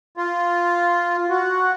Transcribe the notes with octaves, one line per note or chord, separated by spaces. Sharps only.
F4
F#4